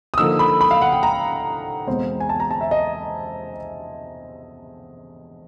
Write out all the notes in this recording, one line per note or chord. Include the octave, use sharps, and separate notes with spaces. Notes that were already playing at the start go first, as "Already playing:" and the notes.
D#6
D3 F3 A#3 D#4 E6
B5
B5
F5
F#5
G5
A#5
E2 B2 G#3 C4
G#5
A5
A#5
A5
E5
D#5